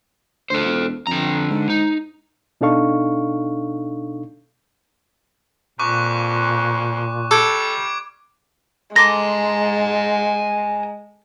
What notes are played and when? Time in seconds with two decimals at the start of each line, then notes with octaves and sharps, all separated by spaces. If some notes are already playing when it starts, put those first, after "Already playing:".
0.50 D2 A4 C5
0.65 E1
1.07 F2 D3 A#5
1.50 G#2
1.70 D#4
2.61 B2 D4 D#4 A4 F5 C#6
5.79 F2 A#2 C#6 D6 F#6
7.31 G3 A4 D6 G#6 D7
8.96 G#3 A4 G#5 A#5 C6 D6 A#6